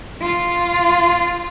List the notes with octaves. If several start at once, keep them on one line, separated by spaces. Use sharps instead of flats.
F4